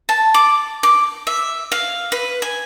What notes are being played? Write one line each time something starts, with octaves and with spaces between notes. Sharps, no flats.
A5
D6
D6
E5
F5
B4
G#5